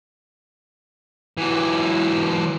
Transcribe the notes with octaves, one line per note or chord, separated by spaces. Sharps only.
E3 F#3